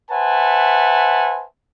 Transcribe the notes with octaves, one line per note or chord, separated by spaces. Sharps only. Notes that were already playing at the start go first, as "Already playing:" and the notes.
B4 C5 E5 F#5 G#5 A5